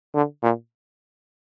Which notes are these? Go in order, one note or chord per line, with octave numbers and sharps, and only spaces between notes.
D3
A#2